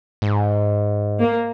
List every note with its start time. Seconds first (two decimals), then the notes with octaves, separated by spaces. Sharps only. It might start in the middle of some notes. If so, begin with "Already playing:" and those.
0.22 G#2
1.19 A#3